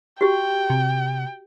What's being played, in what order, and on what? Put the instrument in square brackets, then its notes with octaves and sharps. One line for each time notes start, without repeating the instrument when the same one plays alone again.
[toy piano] F#4 G4 [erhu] G5
[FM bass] C3